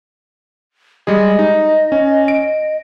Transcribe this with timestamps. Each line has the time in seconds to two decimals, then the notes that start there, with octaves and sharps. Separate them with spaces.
1.07 G3 G#3 G#4 D#5
1.39 D#4
1.92 C#4
2.28 D7